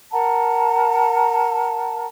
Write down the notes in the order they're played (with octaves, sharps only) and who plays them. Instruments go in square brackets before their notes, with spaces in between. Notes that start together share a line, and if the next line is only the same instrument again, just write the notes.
[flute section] A#4 F#5 A5 A#5